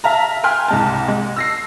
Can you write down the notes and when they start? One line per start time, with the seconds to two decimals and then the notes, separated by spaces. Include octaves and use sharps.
0.04 E5 F5 A5 A#5
0.44 G5 G#5 C6 F6 F#6
0.68 C2 G#3 A5
1.08 G#3
1.36 E6 A#6 C7